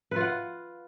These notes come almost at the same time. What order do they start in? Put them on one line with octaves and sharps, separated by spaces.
B4 F4 F#5